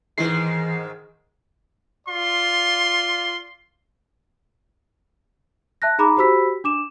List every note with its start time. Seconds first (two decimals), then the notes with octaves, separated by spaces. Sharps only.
0.18 G#2 D#3 E3 G#3 C7
2.07 F4 D5 C6
5.82 E5 A5 F#6 A#6
5.99 D#4 G#4 A#5 B5 D6
6.17 F#4 G4 C5 B5 E6 B6
6.64 D4 D6 E7